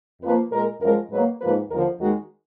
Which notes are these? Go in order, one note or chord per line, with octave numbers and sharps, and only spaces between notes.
F2 F3 A#3 B4
A#2 G#3 A#4
F#2 F3 G#3 A#4
G#2 F#3 A#3 B4
G#2 F3 A#3 B4
D#2 D3 F3 A#4
D#2 D#3 G#3 F#4